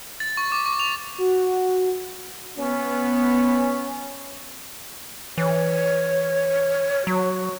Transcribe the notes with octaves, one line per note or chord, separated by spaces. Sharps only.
A6
C#6
D6
C#6
F7
F#4
B3 C#4
E3 C#5
F#3 F#4